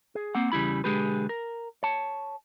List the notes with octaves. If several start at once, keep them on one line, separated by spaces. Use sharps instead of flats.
G#4
A#3 C4 F#5
E2 C#3 G3 E4 B5
B1 D3 G#3 G4 G#4 B4
A#4
C#5 A5